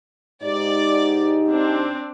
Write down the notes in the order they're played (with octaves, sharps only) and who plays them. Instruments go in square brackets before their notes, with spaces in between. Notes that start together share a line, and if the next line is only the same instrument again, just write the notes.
[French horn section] G#2 D#4 G4 [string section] D5
[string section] C4 D4